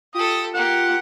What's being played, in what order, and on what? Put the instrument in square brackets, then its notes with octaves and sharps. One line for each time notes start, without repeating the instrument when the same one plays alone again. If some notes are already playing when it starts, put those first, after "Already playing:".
[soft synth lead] F4 [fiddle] G4 A4 [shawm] D#6
[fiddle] A#3 G4 [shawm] F#5